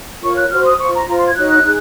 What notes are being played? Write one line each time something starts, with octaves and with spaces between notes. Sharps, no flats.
F4 A#4 C#5 C#6
F#6
F#4 C5 F6
D#6
F4 C5 C#6
A#5
F4 C5 A#5
C6
G#6
D#4 F#4 C#5 F#6
D#4 G#4